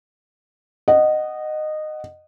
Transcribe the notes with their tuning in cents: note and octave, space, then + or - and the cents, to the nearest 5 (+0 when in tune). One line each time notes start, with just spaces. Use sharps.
D#5 -15 F#5 +10